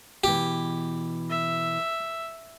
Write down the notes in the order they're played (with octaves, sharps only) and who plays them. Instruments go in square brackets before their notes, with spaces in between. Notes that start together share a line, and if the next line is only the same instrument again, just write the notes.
[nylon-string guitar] B2 E3 [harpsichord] G4
[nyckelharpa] E5